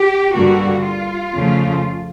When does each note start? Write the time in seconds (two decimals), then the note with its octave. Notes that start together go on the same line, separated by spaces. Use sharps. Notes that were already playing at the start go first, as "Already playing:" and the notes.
Already playing: G4
0.33 G2 D3 G3 A#3 F#4
0.83 F4
1.35 F2 C#3 F3 A3